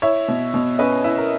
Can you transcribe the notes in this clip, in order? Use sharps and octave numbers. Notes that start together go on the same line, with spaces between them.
E4 C#5 E5
B2
B2
C#4 B4 D#5
E4
A#4